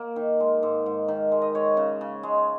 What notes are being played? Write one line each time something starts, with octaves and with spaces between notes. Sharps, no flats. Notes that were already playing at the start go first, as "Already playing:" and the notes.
Already playing: A#3
D#3
G#3
G#2
G#2
D#3
G#3
D#5
G#3 C#5
C#3
C#3
G#3